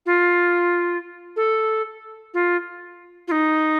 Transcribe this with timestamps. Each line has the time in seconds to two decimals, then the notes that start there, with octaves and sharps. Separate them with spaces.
0.06 F4
1.36 A4
2.34 F4
3.27 F4
3.31 D#4